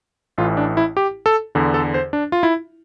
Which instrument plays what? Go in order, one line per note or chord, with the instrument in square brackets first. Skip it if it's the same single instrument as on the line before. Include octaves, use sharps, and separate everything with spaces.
[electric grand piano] A1 A2 E3 F4
D4
E4
G4
A4
E2 D3
A4
C5
D4
F4
E4